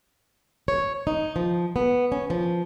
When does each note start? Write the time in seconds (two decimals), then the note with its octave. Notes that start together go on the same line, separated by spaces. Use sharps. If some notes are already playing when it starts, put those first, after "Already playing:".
0.68 C#5
1.07 D#4
1.36 F3
1.76 B3
2.12 C#4
2.30 F3